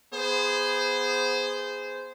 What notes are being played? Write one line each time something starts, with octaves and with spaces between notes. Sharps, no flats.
B3 G#4 C5